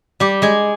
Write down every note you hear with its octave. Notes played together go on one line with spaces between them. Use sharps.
G3 G4
G#3 G#4